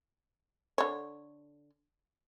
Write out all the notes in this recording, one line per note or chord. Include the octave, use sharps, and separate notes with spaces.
D3 C#5